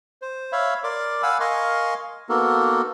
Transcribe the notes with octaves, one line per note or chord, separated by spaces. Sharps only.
C5
C#5 E5 F5 B5
A#4 D5 C6 D6
F5 F#5 G#5 B5 E6
A#4 D#5 F5 G#5 C6 C#6
A#3 B3 D#4 F#4 A4 A#4